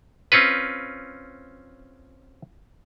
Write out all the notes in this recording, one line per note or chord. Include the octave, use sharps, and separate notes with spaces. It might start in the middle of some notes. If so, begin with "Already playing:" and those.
C4 C#4 F4 B4